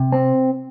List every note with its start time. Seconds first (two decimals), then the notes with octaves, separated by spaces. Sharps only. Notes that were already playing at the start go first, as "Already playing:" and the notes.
Already playing: C3
0.12 C4